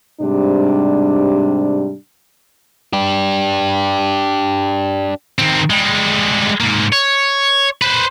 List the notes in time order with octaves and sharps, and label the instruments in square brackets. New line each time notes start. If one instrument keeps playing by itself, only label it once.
[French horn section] G#2 C3 G3 D4
[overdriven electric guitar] D4 G4
[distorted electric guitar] D#3 C4
G3 G#3
G#2 A#3
C#5
B4 C5